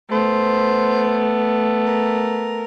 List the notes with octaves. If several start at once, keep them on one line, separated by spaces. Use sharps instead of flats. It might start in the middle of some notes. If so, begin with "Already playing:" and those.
A3 B3 C5
A#4